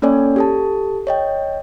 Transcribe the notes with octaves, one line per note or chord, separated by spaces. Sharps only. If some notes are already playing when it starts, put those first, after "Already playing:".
A#3 C#4 A4 C#5 D5 G#5
G4 A4 A5
C#5 D#5 G5